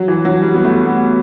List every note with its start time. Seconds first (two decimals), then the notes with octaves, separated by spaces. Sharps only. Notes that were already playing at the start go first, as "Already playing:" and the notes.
Already playing: F#3
0.08 E3
0.25 F#3
0.42 G3
0.54 B3
0.64 A3
0.86 B3